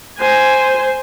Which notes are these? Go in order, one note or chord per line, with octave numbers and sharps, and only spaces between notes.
C5 G#5